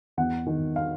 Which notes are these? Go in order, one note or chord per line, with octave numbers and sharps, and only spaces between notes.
E2 F#5
D#3
F5